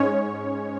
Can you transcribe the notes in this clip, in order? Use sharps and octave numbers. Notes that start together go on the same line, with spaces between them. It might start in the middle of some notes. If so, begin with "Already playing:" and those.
Already playing: G#2 G#3 C#4 C#5